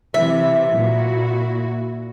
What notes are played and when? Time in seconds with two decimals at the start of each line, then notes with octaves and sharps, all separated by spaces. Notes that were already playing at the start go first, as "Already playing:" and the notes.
0.14 C3 E3 E5
0.75 A#2 E4 F#4